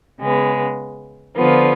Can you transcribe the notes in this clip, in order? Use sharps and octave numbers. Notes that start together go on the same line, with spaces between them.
C#3 G#3 B3
D3 F3 B3 F4